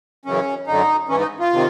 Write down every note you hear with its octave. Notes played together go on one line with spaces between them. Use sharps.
F#2 C#3 E3 C#4
F#2 D3 D#4
G#2 E3 C#4
D#4
F4
C3 D#3